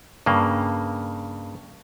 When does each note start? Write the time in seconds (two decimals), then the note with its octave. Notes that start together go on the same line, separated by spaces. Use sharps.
0.26 G2 C#3 A#3